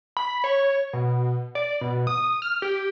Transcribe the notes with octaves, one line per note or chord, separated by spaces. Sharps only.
B5
C#5
B2
D5
B2
D#6
F6
G4